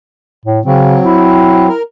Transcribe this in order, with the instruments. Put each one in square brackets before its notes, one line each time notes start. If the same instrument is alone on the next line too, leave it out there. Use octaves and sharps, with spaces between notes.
[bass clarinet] A2
[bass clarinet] C#3 [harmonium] F#3 C4
[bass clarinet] E4
[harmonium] A#4